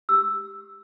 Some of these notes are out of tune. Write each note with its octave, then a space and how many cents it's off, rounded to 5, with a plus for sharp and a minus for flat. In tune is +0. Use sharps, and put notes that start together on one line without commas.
G4 +0 E6 +0